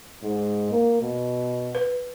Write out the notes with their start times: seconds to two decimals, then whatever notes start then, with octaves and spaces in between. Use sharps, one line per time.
0.23 G#2
0.71 A#3
1.01 B2
1.75 B4